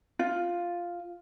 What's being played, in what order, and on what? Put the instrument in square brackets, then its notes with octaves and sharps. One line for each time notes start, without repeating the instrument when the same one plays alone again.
[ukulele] F4